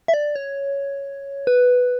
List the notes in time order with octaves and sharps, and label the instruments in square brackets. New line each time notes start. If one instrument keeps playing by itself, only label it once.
[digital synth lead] E5
D5
C#5
B4